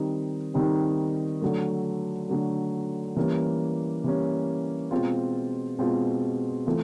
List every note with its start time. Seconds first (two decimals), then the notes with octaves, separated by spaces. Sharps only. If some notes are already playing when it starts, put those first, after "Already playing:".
Already playing: D#3 G3 C4 D#4
0.54 D#3 G3 C4 D#4
1.42 D3 F#3 A3
2.29 D3 F#3 A3
3.16 E3 G3 A#3 C#4
4.04 E3 G3 A#3 C#4
4.91 B2 G#3 C4 F4
5.78 B2 G#3 C4 F4
6.66 E3 A3 C4 F4